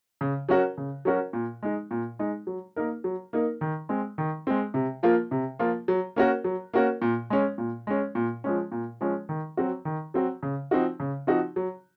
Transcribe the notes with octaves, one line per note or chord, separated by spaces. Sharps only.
C#3
F#3 C#4 F#4 A#4
C#3
F#3 C#4 F#4 A#4
A#2
G#3 D#4
A#2
G#3 D#4
F#3
A#3 D#4 A#4
F#3
A#3 D#4 A#4
D#3
G#3 C4
D#3
G#3 C4
C3
F3 A#3 F4
C3
F3 A#3 F4
F#3
A#3 C#4 F#4 A#4
F#3
A#3 C#4 F#4 A#4
A#2
G#3 C#4
A#2
G#3 C#4
A#2
F3 G#3 C#4
A#2
F3 G#3 C#4
D#3
F#3 C4 F#4
D#3
F#3 C4 F#4
C#3
F3 C4 D#4 F#4
C#3
F3 C4 D#4 F#4
F#3